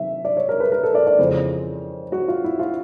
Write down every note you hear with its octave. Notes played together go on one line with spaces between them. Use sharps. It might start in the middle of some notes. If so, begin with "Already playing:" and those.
Already playing: C3 D#3 F#3 E5
D5
C#5
A#4
B4
A#4
A4
D5
D5
F2 C#3 E3 G#3 C5
F#4
F4
E4
F4